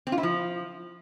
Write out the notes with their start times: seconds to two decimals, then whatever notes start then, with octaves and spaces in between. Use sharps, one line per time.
0.07 C4
0.12 F4
0.18 E4
0.23 F3